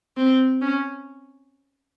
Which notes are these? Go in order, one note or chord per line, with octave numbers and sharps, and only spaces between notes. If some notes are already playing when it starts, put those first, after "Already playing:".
C4
C#4